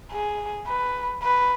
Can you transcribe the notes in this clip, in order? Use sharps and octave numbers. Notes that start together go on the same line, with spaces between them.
G#4
B4
B4